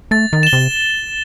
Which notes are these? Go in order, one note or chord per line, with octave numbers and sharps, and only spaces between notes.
A3 A6
D#3
E7 G7
C3